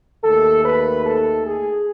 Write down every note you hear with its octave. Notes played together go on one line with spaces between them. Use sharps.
D#2 D#3 A3 A4
B4
A4
G#4